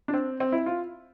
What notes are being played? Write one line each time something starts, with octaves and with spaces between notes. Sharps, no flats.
D4
C4
C4
E4
F4